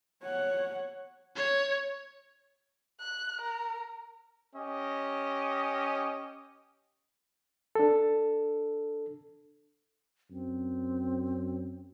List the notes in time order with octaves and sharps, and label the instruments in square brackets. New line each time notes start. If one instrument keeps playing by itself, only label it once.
[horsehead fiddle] C#5 F#5
[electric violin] C#5
[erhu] F#6
A#4
[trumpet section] C#4 G4 D#5
[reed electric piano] D4 A4
[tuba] F#2 [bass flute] C4